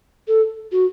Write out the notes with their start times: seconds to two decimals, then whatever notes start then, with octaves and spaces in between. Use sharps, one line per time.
0.28 A4
0.72 F#4